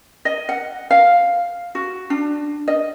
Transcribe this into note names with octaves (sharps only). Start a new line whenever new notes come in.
D#5
F#5
F5
F#4
D4
D#5